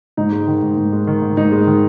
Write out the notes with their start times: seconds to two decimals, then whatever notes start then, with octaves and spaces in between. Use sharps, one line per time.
0.17 G#2 D#4
0.32 G#3
0.47 D#3
0.62 G#2
0.77 G#2
0.92 G#3
1.07 D#3
1.22 G#2
1.37 G#2 D#4
1.52 G#3
1.67 D#3